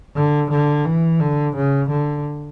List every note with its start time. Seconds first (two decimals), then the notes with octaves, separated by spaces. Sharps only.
0.16 D3
0.50 D3
0.85 E3
1.20 D3
1.55 C#3
1.89 D3